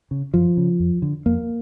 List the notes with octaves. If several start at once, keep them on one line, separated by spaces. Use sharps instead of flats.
C#3
F#2 F3
C#3
F2
D3
F2 A#3